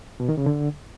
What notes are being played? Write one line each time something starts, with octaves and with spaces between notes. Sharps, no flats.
B2
D#3
C#3
D3